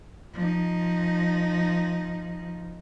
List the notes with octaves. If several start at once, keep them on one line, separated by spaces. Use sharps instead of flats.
F3 D#4